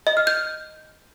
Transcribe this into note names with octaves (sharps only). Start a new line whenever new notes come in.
D#5
F6
G6